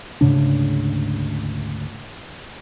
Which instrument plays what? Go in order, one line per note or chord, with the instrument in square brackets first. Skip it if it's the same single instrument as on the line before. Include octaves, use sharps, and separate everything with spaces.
[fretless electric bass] D2 G#2 C#3 D4